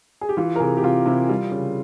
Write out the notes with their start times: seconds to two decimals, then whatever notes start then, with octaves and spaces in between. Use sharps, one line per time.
0.21 G#4
0.29 G4
0.37 E3 F4
0.55 A#4
0.60 C3 G#4
0.77 G4
0.83 C3 F4
1.06 C3 E4
1.29 G3 F4
1.51 C#3